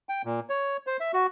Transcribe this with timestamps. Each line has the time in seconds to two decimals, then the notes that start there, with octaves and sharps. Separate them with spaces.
0.09 G5
0.25 A#2
0.50 C#5
0.87 C5
1.00 E5
1.14 F#4